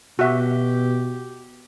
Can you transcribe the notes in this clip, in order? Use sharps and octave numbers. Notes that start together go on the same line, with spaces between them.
B2 F#4 G4 E5